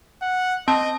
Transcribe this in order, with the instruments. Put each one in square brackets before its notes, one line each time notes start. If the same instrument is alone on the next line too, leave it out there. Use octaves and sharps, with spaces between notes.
[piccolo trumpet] F#5
[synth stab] C4 [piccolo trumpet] D#5 [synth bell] A5